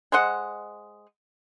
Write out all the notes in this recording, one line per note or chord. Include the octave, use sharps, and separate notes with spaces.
G#3 C5 D#5 F#5